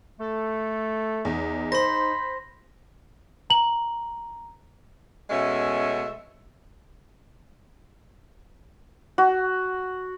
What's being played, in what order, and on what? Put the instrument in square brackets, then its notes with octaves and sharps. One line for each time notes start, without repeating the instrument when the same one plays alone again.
[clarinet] A3 [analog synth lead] A4
[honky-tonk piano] E2 [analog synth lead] D#4
[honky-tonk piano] C5 [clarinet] B5 [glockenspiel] C6 A#6
[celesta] A#5 F#7
[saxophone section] B2 G#3 A3 C#4 E5
[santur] F#4